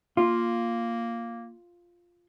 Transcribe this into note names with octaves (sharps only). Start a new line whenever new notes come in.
A#3 F4